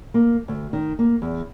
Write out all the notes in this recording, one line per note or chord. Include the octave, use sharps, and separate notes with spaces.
A#3
D2
D#3
A#3
E2